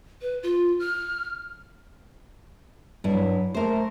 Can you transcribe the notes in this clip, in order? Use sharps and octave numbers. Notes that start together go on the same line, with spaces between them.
B4
F4
F6
G2 F#3 E4
A3 A#4 C5